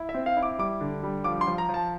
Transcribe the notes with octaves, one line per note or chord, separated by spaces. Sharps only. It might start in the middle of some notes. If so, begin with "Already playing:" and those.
Already playing: E4
E5
C4
F5
E4
D6
G3 D6
D3
G3
F3 D6
C6
F3
A#5
F3
A5